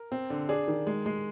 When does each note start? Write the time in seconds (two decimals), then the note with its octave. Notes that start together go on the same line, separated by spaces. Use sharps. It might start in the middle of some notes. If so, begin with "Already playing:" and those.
Already playing: A#4
0.12 C4
0.30 D3
0.49 D4 G#4
0.68 D#3
0.87 G#3
1.06 G#3